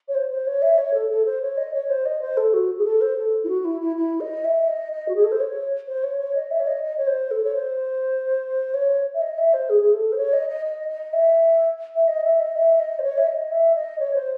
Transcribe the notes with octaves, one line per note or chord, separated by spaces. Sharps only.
C#5
C5
C5
C#5
E5
C#5
A4
A4
C5
C#5
D#5
C#5
C5
D#5
C5
A4
F#4
G#4
A4
C5
A4
E4
F#4
E4
E4
E4
D#5
E5
D#5
D#5
F#4
G#4
A4
C5
C#5
C5
C#5
C#5
D#5
E5
C#5
D#5
D#5
C#5
C5
A4
C#5
C5
C#5
E5
D#5
E5
C5
G#4
G#4
A4
C5
C#5
D#5
D#5
D#5
D#5
E5
E5
D#5
E5
D#5
E5
D#5
C5
C#5
E5
D#5
E5
D#5
C#5
C5